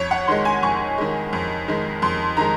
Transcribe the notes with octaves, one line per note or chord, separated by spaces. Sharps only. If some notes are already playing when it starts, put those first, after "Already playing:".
Already playing: F2 C#5
F#5
D#3 G#3 C6
G#5
F2 C#6
D#3 G#3
F2
D#3 G#3
F2 C6
D#3 G#3 A#5